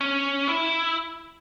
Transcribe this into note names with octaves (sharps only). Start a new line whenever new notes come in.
C#4
E4